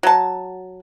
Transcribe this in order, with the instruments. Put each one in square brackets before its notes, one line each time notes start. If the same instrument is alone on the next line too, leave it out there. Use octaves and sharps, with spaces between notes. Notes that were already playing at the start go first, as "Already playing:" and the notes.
[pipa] F#3 A5